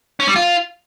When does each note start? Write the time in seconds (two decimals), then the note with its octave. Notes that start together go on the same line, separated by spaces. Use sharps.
0.20 C#4
0.28 G3
0.36 F4